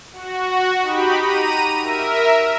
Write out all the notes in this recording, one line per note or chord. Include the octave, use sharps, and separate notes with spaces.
F#4
D#4 G4 B5
A#5 D#7
A#4 E5